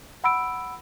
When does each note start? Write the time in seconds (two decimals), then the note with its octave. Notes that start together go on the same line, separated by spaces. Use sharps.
0.24 F#5 B5 E6 D7